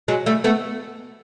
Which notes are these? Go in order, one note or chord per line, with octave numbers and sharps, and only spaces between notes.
F#3 G#3
G3 A3
A3 B3